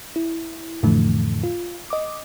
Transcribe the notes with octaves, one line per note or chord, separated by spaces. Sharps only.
E4
F2 A2 D3 E3 F3 A3
F4
D#5 D6